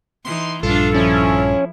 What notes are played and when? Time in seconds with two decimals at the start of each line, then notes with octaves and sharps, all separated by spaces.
0.25 E3 D#4 C6
0.63 A#1 G2 D4 F4 A4
0.95 F3 C#4 E4